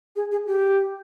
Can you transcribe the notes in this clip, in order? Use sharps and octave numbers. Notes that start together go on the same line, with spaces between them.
G#4
G#4
G4